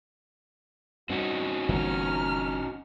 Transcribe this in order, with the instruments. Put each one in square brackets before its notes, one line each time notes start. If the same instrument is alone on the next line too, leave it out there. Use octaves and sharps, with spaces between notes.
[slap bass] G2 [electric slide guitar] C4 C#4 D#4 [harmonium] F#4 F#5
[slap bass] G1 A#2 E3 [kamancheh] A#5 F6